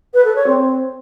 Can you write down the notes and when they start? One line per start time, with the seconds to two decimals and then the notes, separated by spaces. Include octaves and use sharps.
0.13 B4
0.24 A4
0.35 C#5
0.46 C4